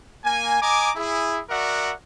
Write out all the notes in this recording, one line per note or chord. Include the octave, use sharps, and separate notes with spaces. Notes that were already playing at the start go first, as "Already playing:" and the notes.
A#3 G#5
D#5 G#5 A#5 D6
E4 G#4
F#4 A#4 D5 E5 F#5